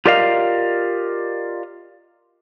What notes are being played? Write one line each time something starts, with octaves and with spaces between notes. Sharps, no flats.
F4 G4 A#4 D5 D#5 F5